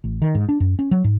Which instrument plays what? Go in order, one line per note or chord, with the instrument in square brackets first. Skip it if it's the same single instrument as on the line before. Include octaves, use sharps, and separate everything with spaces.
[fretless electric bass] A1
D#3
G#2
D4
F#2
C#4
F#3
G#2